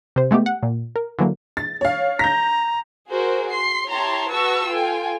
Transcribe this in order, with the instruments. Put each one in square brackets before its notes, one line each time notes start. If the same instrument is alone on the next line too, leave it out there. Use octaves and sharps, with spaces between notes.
[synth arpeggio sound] C3 C5
G#3 A3 B3 G4
F#5
A#2
A#4
D3 E3 F#3 A#3
[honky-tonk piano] A6
C#5 F5
[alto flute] A#5 [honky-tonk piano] G6 A#6
[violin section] F#4 G#4 A#4 C5
C6 C7
E4 G4 C#5 A5 A#5 C6
F#4 G#4 B4 A5 C#6 E6
F4 A4 G5 G#5